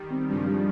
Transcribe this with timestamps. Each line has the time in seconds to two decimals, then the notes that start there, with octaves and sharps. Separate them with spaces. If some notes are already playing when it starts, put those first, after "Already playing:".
Already playing: D#3 G3
0.10 C4
0.28 G2 C#3 F3
0.47 G3